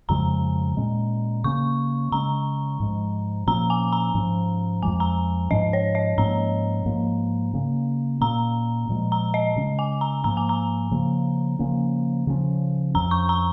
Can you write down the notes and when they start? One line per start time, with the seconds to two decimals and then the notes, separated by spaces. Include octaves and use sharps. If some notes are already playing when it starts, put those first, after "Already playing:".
0.09 F2 C#3 F3 G#3 A#5
0.77 A#2 G#3 C#4
1.44 C#3 A#3 C#4 C#6
2.12 C#3 G#3 C#4 A#5
2.80 G#2 F3 G#3
3.47 A#2 F3 A#3 C#4 A#5
3.70 G#5
3.93 A#5
4.15 G#2 F3 C#4
4.83 F2 F3 G#3 G#5
5.00 A#5
5.50 G#2 F3 C#4 D#5
5.73 C#5
5.95 D#5
6.18 G#2 F3 A#3 C#4 A#5
6.86 G#2 F3 A#3
7.54 C#3 A#3 C#4
8.21 A#2 A#3 C#4 A#5
8.89 A#2 F3 G#3
9.12 A#5
9.34 D#5
9.56 C#3 G#3 C#4
9.79 G#5
10.01 A#5
10.24 G#2 F3 A#3 A#5
10.37 G#5
10.49 A#5
10.91 C#3 F3 A#3
11.59 C#3 F3 A#3 C#4
12.27 C#3 F3 C#4
12.94 F2 F3 C#4 A#5
13.11 C#6
13.29 A#5